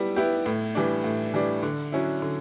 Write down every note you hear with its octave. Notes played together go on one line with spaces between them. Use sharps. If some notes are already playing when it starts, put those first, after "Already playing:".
Already playing: G3 B3 E4
B3 E4 G4
A2
E3 G3 D4
A2
E3 G3 D4
D3
F#3 C#4 E4
D3